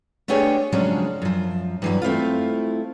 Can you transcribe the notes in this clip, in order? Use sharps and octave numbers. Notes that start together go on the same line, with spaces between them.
A3 B3 D4 G4 G#4 C#5
C#3 F3 F#3 G#3 C#4 D4
F#2 F3
G2 E3 F#3
A3 C4 E4 F4